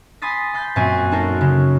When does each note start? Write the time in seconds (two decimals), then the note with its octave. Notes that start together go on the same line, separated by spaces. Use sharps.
0.22 G#5 B5 C6 D#6 A6 B6
0.54 B5 C6 G6 A6 B6
0.76 F#2 A#2 C4 F#4 G#5 C7
1.11 C#4 D#4 F#4 A4 A#4 C5
1.41 C#3